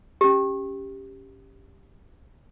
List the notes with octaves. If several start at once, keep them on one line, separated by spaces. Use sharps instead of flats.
C#4 G4